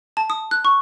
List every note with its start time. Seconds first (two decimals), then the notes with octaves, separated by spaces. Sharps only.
0.17 A5
0.30 D#6
0.51 F#6
0.65 C#6